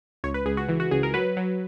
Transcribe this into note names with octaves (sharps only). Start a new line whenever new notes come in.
C#2 C#5
B4
C#2 G#4
F#4
E3
F#4
C#2 G#4
A#4
F#3 B4
F#3